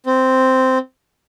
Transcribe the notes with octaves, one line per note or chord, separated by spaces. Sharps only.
C4